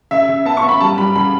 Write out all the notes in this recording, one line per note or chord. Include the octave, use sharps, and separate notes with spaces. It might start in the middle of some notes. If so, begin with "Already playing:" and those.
C#3 E5
C#3
B3 A5
C#6
B3
B5
G3 A5
G3 B5
C#3 B5